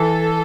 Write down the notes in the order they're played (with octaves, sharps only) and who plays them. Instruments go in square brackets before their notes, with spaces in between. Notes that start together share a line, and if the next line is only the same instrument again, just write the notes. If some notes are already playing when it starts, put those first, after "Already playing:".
Already playing: [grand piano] E3 [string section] A4